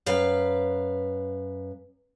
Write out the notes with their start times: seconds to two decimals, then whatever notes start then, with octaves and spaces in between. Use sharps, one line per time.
0.06 F#2 B4 F5